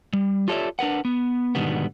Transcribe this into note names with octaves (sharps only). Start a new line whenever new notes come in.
G3
F4 G4 A4 C#5 D5 E5
D4 A#4 B4 F#5
B3
G#2 B2 D3 D#3 G3 B3